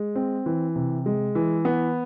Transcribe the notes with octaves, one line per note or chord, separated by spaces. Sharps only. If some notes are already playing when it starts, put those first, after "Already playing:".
Already playing: G#3
C4
E3
C3
G#3
E3
B3